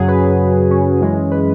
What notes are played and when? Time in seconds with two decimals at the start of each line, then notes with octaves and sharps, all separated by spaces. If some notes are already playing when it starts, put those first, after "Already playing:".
Already playing: F#2 C#3 F#3 F#4 G#4
0.08 B4
0.36 B4
0.71 C#4
1.01 F#2 E3 G#3
1.31 B4